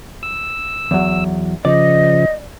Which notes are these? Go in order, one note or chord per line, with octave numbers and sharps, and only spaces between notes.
E6
E2 F#3
C#3 F3 D5 D#5